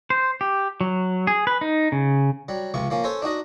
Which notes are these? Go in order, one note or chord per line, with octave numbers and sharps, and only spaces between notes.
C5
G4
F#3
G#4
B4
D#4
C#3
F#3 G3
C#2 C3 F3 C#6
F3 A#3 C#4
C#4 A4 C5 C#5
D4 D#4 F#4 D#5